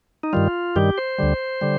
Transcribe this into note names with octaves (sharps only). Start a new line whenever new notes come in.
D#4
G2 D#3 G3 F4
G2 D#3 G3 G4
C5
D2 D3 G3
D3 G3